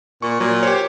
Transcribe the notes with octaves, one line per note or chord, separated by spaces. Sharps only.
A#2 C#6
A#2 F#3
G4 C5 C#5